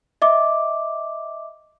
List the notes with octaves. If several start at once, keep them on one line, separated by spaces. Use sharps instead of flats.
D#5 E5 D6